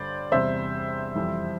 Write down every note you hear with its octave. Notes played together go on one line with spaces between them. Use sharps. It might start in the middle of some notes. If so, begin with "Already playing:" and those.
Already playing: G2 D3 G3 C5 D5
E2 C3 G3 C5 E5
F2 E3 G3